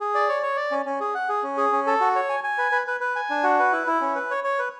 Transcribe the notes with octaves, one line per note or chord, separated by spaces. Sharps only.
G#4
D5
C#5
C#5
D5
C#4
C#4
G#4
F#5
G#4
C#4
G#4
C#4
A4
F#4
C#5
G#5
G#5
B4
B4
B4
B4
G#5
D4
F#4
B4
E4
E4
C#4
B4
C#5
C#5
B4